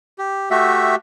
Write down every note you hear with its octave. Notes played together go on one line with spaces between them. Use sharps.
G4
A3 F#4 G4 E5